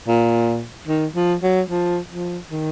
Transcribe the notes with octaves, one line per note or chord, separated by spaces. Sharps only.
A#2
D#3
F3
F#3
F3
F3
D#3